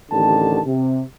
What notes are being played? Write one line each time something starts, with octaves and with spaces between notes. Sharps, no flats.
A1 D3 D#3 G4 A5
C3